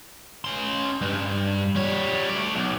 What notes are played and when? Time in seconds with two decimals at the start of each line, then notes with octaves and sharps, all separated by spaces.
0.45 C#4 C6
1.01 G2
1.76 G3 C#5
2.30 A3 D5
2.55 B1